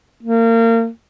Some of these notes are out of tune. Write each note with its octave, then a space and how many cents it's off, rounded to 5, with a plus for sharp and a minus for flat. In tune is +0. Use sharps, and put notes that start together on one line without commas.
A#3 -30